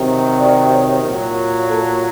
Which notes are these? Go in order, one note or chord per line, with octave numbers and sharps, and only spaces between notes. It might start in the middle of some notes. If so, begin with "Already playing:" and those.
Already playing: C3 D#3 F#3
D5
C#5
A#2 F#3
A4